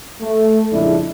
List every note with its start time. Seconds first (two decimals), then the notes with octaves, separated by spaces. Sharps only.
0.22 A3
0.72 A#1 F2 C#3 G#3 D4 E4